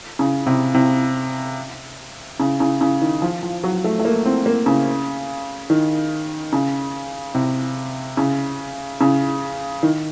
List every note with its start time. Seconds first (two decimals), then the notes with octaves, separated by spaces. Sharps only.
0.19 C#3
0.46 C3
0.74 C3
2.40 C#3
2.60 C#3
2.81 C#3
3.02 D#3
3.22 F3
3.43 F3
3.64 F#3
3.84 A3
3.99 A3
4.05 A#3
4.25 C4
4.46 A#3
4.66 C#3
5.70 D#3
6.53 C#3
7.35 C3
8.17 C#3
9.01 C#3
9.83 D#3